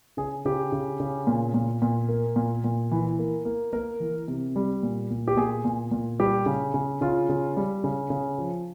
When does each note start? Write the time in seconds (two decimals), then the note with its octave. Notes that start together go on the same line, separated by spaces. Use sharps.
0.17 C#3 G#4
0.45 C#3 G4
0.72 C#3
1.00 C#3
1.27 A#2
1.54 A#2
1.82 A#2
2.09 A#3
2.36 A#2
2.64 A#2
2.91 E3
3.19 A#3
3.45 A#3
3.73 A#3 A#4
4.00 E3
4.28 C3
4.56 G3
4.83 A#2
5.10 A#2
5.28 G4
5.37 A#2 G#4
5.65 A#2
5.91 A#2
6.20 G3 G4
6.46 C#3
6.74 C#3
7.01 C#3 F4
7.29 C#3
7.57 G3
7.84 C#3
8.10 C#3
8.38 F3